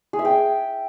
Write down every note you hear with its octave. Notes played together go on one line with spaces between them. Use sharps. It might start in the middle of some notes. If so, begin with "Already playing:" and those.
G#4
E5
G5